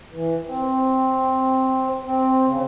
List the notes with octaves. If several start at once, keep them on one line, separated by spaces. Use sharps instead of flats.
E3
C4
C4
C#3